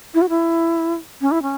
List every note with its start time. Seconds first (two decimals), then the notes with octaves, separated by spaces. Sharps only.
0.14 E4
0.21 F#4
0.29 E4
1.21 C#4
1.31 E4
1.42 C#4